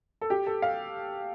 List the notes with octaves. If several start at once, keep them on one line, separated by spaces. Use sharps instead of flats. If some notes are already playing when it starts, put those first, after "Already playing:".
A4
G4
A4
F5